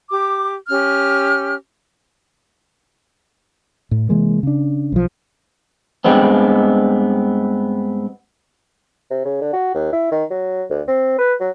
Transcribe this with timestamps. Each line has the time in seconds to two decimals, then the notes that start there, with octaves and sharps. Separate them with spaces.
0.10 G4 D6
0.69 C#4 G4 F6
3.91 A2
4.09 C3 E3 G#3 A#3
4.43 C#3 D4
4.92 B1 F3
6.04 G2 G3 G#3 B3 C4
9.10 C3
9.25 C#3
9.41 D3
9.53 F#4
9.75 D#2
9.93 E4
10.11 D#3
10.31 F#3
10.70 D2
10.88 C4
11.19 B4
11.40 F#3